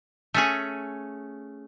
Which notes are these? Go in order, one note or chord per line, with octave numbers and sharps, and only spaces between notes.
A3 C#4 G#4